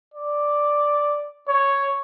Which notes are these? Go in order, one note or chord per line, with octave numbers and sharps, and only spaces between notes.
D5
C#5